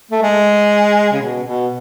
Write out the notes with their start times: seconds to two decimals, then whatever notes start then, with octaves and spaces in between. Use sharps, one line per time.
0.11 A3
0.22 G#3
1.12 C#3
1.22 B2
1.44 B2